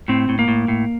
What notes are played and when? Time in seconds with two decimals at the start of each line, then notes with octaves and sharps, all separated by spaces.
0.08 A2 C4
0.29 A2
0.39 A#3
0.48 A2
0.68 A2